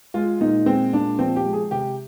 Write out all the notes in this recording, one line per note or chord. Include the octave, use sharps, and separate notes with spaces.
G#3 F4
A#2 D#4
G#3 C4
A#2 D4
F3 C4
G4
G#3
G#4
C3 G4